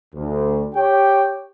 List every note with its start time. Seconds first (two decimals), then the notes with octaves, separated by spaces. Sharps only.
0.15 D2
0.75 G4 C#5 G5